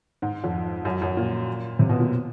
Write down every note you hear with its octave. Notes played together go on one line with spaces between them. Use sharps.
G#2
F2
F#2
F#2
A#2
C3
B2
A#2